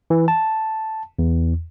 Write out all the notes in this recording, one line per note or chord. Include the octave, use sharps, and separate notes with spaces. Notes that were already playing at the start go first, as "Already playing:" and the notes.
E3
A5
E2